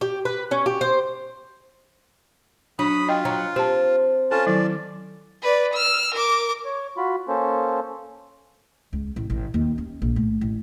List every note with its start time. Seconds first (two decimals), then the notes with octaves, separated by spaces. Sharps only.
0.01 G4
0.25 B4
0.51 C#4
0.66 G4
0.81 C5
2.79 F#3 D4 B5 D#6
3.09 F4 D#5 G5
3.25 F#3 A#5
3.56 C4 G4 A5
4.31 C#4 F4 A4 A5
4.47 D#3 F#3 E4 D5
5.43 B4 D5
5.74 E6 F6
6.15 A#4 D6
6.65 C#5
6.97 F4 F#4 B5
7.28 A#3 C#4 A4 C5
8.93 C#2
9.16 A1
9.30 A1
9.54 D#2
9.78 C#4
10.02 A#1
10.16 A2
10.41 A1